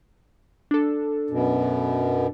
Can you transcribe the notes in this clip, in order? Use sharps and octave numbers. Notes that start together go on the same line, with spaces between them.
D4 A4
F#2 B2